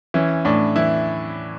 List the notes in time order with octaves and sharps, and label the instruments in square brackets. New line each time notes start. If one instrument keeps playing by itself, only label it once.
[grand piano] E3 C#4
A2 D4
E3 E4